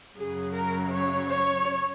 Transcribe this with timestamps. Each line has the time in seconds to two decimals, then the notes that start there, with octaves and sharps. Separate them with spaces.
0.16 F#2 C#3 F#3 G#4
0.54 A#4
0.92 C#5
1.30 C#5